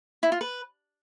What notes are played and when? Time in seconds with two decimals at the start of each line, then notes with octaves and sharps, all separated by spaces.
0.23 E4
0.32 F4
0.41 B4